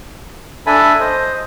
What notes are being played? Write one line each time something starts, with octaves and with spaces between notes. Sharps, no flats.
D4 A4 E5 G#5 A5 B5
C5 D#5